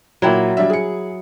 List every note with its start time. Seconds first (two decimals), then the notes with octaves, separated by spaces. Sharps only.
0.22 A#2 F#3 E4 G5 A#5
0.57 G3 D4 E5
0.70 G#4 C#7